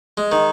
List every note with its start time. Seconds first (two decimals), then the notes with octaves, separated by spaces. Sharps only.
0.17 G#3
0.32 D#3